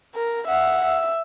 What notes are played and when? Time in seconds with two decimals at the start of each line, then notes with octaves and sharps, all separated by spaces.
0.15 A#4
0.48 E5 F#5
0.85 E5